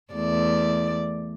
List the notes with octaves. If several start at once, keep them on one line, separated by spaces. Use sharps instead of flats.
E2 A3 D5